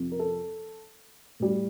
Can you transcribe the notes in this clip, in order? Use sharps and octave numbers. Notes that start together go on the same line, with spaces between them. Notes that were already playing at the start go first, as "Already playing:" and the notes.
Already playing: F2 C3 F3
A#4
A4
A2 G3